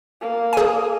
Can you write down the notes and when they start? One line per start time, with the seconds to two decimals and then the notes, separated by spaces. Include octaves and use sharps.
0.21 A#3
0.53 G#4 G#5